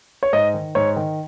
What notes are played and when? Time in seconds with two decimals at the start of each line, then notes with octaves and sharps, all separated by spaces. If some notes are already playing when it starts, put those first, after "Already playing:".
0.23 C#5
0.33 G#2 D#5
0.54 D#3
0.75 G#2 C#5
0.96 D#3